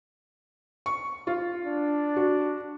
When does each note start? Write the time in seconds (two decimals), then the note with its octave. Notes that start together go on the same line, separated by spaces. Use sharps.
0.86 C#6
1.27 F4
1.65 D4
2.16 F#4